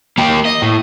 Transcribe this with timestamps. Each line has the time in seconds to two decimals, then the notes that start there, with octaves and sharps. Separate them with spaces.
0.18 A#3 G4
0.46 D#5
0.62 A2